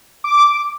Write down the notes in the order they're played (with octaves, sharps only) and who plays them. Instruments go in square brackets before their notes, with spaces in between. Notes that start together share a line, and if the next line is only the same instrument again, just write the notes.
[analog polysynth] D6